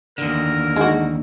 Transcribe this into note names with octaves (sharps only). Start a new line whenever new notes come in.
D#2 D3 A#4
G#3 D#4 F#4